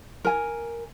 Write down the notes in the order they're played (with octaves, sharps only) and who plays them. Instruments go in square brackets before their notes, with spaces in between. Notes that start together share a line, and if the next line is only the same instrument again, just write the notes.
[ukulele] A#4 G#5